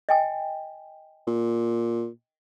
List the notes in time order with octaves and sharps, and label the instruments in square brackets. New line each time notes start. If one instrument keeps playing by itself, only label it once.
[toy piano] D#5 G5 G#5
[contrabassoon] A#2